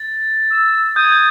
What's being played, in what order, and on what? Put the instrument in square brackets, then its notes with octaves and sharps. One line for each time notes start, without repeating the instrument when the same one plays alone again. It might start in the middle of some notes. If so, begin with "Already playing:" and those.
Already playing: [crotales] A6
[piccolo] E6
[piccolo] D#6 [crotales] G6
[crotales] G#6
G6